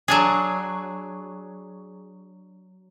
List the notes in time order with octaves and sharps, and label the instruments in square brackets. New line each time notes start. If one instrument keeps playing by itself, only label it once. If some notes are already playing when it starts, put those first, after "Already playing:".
[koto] F#3 D4 G#4